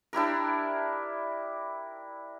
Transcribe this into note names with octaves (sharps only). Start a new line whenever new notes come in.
D4 E4 G4 A#4